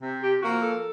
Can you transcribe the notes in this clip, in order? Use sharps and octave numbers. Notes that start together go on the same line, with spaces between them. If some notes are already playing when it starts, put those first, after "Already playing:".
C3
G4
F3 A#3 F#4
A4